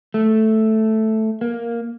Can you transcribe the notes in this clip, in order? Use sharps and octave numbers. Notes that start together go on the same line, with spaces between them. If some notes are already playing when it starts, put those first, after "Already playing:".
A3
A#3